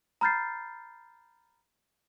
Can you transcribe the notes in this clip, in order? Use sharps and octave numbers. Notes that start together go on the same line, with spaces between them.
A#5 B5 F6 G6 A6 C7